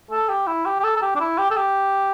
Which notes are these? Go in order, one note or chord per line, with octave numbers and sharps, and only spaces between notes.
A4
G4
E4
G4
G4
A4
A4
G4
D4
E4
G4
A4
G4